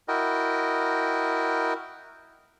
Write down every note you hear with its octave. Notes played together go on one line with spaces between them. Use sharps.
E4 F#4 A#4 D#5 G5